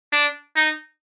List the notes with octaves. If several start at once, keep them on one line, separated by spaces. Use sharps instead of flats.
D4
D#4